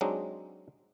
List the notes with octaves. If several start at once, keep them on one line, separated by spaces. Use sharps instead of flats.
F#3 G#3 C4 D4 D#4